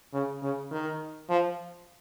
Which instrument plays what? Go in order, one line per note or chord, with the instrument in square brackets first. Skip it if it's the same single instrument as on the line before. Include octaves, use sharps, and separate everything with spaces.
[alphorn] C#3
C#3
D#3
F3